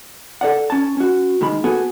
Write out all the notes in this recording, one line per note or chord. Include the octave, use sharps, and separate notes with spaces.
A4 D5 F#5
C#4 A5
C#4 F#4
G#2 D#3 G#3 B5
B3 F#4 G#4 A4